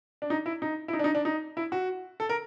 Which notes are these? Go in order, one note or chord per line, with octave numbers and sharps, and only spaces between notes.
D4
D#4
E4
D#4
E4
D#4
D4
D#4
D4
D#4
E4
F#4
A4
A#4